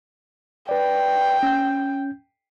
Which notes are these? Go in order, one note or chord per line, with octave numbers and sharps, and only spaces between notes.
B4 D5 G5
C#4 G6